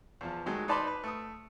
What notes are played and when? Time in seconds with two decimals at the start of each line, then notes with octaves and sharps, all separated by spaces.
0.21 E2 F3
0.46 D#3 F#3 G#3 A3
0.68 D#4 B4 D5 A5 B5 C6
0.87 B4
1.04 A3 D#6